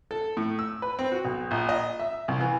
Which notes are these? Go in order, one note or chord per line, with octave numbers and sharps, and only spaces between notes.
A4
A2
E6
B4
C4
F#4
B1
A#1
D#5
E5
C2
E3